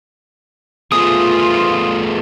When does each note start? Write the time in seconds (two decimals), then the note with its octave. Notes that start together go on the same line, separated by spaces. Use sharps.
0.92 A3 B3 F4 G#4 D#6